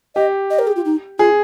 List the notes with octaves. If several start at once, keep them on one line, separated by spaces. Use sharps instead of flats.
G4 D#5
D#5
A#4
G#4
F4
D#4
F4 G#4